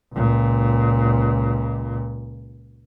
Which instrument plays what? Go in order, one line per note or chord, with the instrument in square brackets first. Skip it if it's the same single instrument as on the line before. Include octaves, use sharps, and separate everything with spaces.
[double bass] C#2 A#2